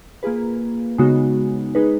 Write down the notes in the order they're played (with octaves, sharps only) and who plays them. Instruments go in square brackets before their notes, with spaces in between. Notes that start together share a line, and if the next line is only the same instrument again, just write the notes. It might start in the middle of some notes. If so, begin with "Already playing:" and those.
[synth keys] A#3 F4 G#4 B4
C#3 G#3 B3 D#4 F#4
G#3 D#4 G#4 B4